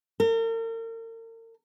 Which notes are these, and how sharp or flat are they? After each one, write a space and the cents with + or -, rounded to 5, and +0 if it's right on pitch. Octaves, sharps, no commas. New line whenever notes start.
A#4 -40